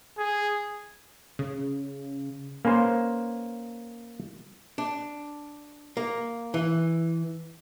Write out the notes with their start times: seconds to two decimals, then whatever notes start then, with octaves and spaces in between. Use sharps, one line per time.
0.18 G#4
1.39 C#3
2.65 A#3 C#4 B4 C5
4.78 D4
5.97 A#3
6.54 E3